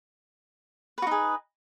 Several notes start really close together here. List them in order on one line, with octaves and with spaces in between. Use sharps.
B4 F#4 D#4 G#4